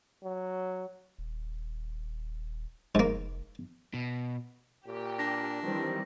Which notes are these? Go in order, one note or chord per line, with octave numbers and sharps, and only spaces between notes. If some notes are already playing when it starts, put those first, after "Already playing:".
F#3
D#1
F1 G#2 A#3
B2
A#2 G4
D4 A#6
D#3 E3 G3 C4